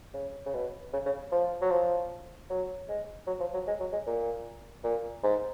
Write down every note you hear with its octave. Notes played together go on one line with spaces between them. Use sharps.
C#3
C#3
B2
C#3
C#3
F3
F#3
F3
F#3
G#3
F#3
F3
F#3
G#3
F#3
G#3
A#2
A#2
G#2